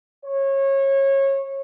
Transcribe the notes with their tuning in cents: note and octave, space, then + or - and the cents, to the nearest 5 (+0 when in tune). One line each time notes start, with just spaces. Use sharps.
C#5 -25